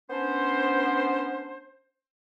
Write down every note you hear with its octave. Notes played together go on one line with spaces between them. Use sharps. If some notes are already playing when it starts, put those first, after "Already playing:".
B3 C#4 D4 C5